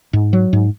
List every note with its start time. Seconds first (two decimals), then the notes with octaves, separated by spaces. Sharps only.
0.13 G#2
0.33 F#3
0.53 G#2